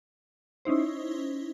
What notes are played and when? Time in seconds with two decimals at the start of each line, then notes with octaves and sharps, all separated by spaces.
0.65 C#4 D#4 E4 C5